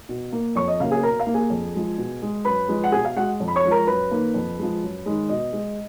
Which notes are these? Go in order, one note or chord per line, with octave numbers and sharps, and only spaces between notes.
B2
A#3
F2 C#5 C#6
D#5
C#3 F#3 A#3 F5
G#4 G#5
B2 A#4 A#5
F5
A#3
G#4 G#5
F2
F3 G#3
B2
G#3
F#2 B4 B5
F3 G#3
F#5
B2 G#4 G#5
F5
G#3 F#4 F#5
F2
B5
C#5 C#6
F3 G#3
A#4 A#5
F#2 B4 B5
D#3 A#3
F2
F3 G#3
F#2
D#3 G#3
B2 D#5
G#3